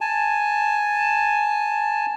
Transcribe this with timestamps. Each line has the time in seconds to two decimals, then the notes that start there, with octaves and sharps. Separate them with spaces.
0.01 G#5 A5